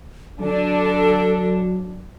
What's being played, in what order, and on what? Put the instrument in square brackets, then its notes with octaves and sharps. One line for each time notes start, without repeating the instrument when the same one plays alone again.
[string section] D3 D4 [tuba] F#3 [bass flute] A4